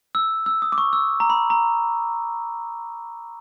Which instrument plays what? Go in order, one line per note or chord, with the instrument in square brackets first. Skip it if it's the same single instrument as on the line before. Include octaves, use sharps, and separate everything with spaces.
[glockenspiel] E6
E6
D#6
D6
C#6
E6
A#5
B5
A#5